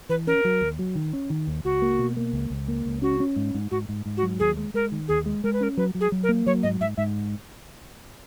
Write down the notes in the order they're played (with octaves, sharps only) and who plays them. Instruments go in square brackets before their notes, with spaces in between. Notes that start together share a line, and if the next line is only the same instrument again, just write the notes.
[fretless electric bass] E3 [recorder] B4
[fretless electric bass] C#4 [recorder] A#4
[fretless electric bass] F#3
D#2
F#3
D#3
C#4
D#3
D#2
[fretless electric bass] C#2 [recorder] F#4
[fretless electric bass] A#3
B2
A#3
C#2
C#2
A#3
C#2
[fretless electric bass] C#4 [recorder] F#4
[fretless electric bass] C#4
G#2
G#2
[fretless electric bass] G#2 [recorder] F#4
[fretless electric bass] G#2
G#2
[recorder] F#4
[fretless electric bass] F#3
[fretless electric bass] D#2 [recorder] G#4
[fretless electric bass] G#3
[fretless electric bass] G#3 [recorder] A#4
[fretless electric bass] D#3
[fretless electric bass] D#2 [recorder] G#4
[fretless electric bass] G#3
[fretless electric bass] G#3 [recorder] A#4
[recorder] B4
[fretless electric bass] C#4 [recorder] A#4
[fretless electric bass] F#3 [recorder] B4
[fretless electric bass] F#3
[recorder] G#4
[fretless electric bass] F#3
[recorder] A#4
[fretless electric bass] A#3
[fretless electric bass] F#3 [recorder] C#5
[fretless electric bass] G#2 [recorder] D#5
[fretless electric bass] G#2 [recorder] E5
[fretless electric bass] G#2 [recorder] E5